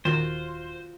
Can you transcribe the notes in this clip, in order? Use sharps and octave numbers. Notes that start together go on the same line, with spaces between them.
D#1 D#3 F4 F#4 C5